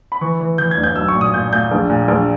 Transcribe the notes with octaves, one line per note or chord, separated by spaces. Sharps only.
B5
E3 C#6
E3
E3 G6
G#6
G1
G6
B1 E6
C#6
A#2
D#6
A#2 G6
A#2 G6
A#1
A#2
A#1